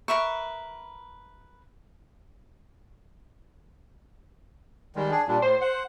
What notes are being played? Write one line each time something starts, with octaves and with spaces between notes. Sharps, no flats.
A#4 B4 E5 C#6
D#3 G3 G#3
D4 G#4
A#2 G3 D4
A2 C5
F#5